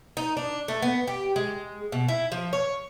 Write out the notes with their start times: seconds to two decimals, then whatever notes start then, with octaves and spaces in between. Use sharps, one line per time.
0.17 D#4
0.37 D4
0.68 A3
0.82 B3
1.07 G4
1.36 G#3
1.92 B2
2.08 E4
2.32 F3
2.53 C#5